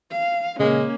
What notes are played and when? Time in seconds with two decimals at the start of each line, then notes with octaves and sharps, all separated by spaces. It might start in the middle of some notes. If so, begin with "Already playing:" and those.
0.11 F5
0.60 A#2 C#3 G#3 A#3 C#4